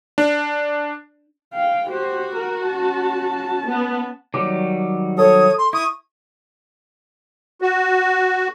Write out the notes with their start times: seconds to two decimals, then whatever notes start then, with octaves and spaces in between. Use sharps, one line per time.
0.18 D4
1.54 F5 G5
1.89 F#4 G4 C5
2.35 A#4
2.68 C#4 A5
3.67 B3
4.34 D#3 F#3 G3 D6
5.18 A4 C#5 D#6
5.58 C6
5.73 E4 C#6 D#6
7.62 F#4